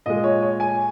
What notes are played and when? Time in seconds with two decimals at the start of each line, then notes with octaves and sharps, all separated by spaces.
0.06 A#2 G#3 D#5
0.24 C#5
0.42 C#5
0.60 G#5